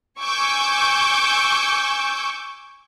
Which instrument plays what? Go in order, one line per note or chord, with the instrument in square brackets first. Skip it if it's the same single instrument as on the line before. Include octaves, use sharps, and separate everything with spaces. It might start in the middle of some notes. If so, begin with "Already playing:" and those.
[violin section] G#5 C#6 D6 E6 G6